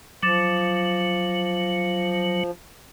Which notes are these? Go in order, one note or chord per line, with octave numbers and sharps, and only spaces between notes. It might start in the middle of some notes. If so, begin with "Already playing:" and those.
F3 F#3 D6 A6 E7